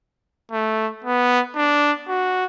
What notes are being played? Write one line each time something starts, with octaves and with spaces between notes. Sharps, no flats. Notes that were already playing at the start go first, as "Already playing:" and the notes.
A3
B3
D4
F#4